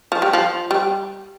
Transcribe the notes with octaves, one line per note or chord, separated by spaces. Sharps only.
F3
G3
F3
G3